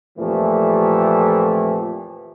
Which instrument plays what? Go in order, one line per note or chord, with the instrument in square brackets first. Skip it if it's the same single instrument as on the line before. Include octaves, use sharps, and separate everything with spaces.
[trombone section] F2 A#2 E3 F3 A3 G4